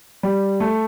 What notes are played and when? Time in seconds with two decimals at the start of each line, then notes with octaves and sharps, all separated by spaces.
0.23 G3
0.60 A3